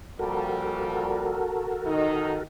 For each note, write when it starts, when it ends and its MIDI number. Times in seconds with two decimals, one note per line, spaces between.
0.19 1.48 46
0.19 1.48 53
0.19 1.48 55
0.19 2.43 66
0.19 2.43 69
0.19 2.43 70
1.85 2.40 51
1.85 2.40 63